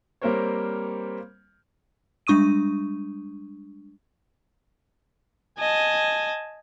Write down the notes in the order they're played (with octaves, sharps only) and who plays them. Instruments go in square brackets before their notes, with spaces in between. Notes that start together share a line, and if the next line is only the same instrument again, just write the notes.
[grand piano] G3 A#3 C4 A#4 C5 C#5
[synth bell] G3 G#3 D4 C#6 D#6 D#7
[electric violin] D#5 A5 [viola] G#5